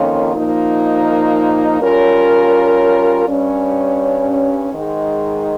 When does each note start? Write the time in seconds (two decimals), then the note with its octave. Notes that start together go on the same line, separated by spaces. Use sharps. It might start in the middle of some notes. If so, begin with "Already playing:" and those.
Already playing: F2 D#3 A#3 C#4 F4
0.34 A#2 F3 A#3 D#4
1.80 G3 C#4 F4 A#4 C#5
3.26 G2 G3 C#4
4.71 G#2 D#3 G#3